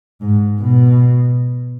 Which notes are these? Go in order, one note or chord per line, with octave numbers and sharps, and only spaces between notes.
G#2
B2